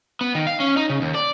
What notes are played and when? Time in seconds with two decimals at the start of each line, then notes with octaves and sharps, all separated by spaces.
0.21 B3
0.35 D#3
0.47 F5
0.60 C#4
0.77 D#4
0.90 C#3
1.02 D#2
1.15 D5